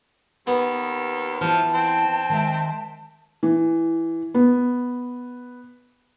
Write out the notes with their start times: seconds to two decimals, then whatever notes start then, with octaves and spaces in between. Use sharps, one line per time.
0.47 D#2 B3
1.41 E3 F3 E4 A5
1.74 C4
2.29 D#3 G#3 E5
3.43 E3
4.34 B3